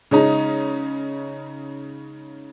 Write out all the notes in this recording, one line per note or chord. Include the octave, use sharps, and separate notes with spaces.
C#3 G#3 C#4 D#4 A#5